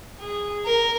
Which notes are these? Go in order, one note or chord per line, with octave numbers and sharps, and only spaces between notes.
G#4
A#4